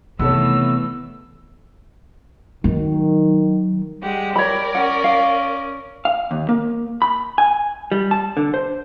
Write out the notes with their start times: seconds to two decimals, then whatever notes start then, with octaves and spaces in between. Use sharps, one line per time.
0.19 C3 D#3 E3 A3 B3 A4 C#5 E6
2.64 D#3 F#3
4.02 G3 G#3 G4 F#5
4.36 A#4 C#5 D5 B5
4.75 C#4 F#5
5.04 F5
6.05 F5
6.31 D#2
6.49 A#3
7.02 B5
7.38 G#5
7.92 G3
8.11 A5
8.37 D3
8.54 C5